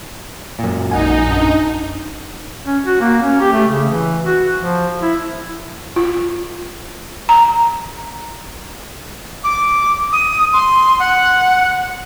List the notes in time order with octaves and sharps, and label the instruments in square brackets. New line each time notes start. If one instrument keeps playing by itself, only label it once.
[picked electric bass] F#2 A#2
[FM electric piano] A#1 F#5 G#5 [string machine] D#4
[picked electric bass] F#2 D4
[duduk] C#4
F#4
A#3
C#4
G4
A3
C#3
E3
F#4
F3
E4
[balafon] F4
A#5
[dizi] D6
D#6
C6
F#5